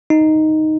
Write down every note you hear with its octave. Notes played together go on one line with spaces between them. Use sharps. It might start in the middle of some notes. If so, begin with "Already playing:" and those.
D#4